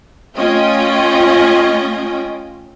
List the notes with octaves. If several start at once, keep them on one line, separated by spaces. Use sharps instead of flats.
A3 C#4 F4 D#5 G5